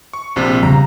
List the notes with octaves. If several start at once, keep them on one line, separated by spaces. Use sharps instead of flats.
C#6
A#1 C3
C#3 G3 A#5